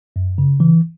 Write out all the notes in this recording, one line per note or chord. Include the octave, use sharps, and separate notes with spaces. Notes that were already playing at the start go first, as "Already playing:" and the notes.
F#2
C#3
E3